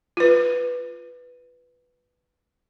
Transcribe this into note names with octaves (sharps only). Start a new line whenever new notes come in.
F4 B4